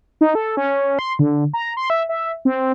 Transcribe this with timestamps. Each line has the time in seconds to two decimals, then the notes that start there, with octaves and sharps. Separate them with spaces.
0.21 D#4
0.35 A4
0.57 C#4
0.99 C6
1.19 D3
1.54 A#5
1.77 C6
1.90 E5
2.09 E5
2.45 C4